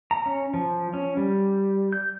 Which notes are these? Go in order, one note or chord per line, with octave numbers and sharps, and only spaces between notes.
A#5
C#4
F3
C#4
G3
G6